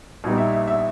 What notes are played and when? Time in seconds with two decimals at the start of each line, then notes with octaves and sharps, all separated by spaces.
0.24 A#1 A#2 G3 B3 D#4
0.38 E5
0.53 E5
0.67 E5